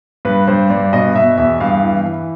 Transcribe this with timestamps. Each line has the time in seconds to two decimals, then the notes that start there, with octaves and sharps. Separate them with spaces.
0.25 G2 B4
0.47 G2 C5
0.70 G2 D5
0.93 B2 D#5
1.15 B2 E5
1.38 E2 E5
1.60 G2 F5
1.83 E3
2.06 E3